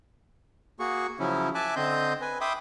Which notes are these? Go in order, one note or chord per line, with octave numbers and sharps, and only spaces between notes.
A#3 F#4 G#4 C#6
C#3 F3 F#3 C#4 E4
E5 G#5 A5 D6 F#6
D3 C4 D#5 C6 G6
B4 G#5
E5 G5 B5 C6 D6 D#6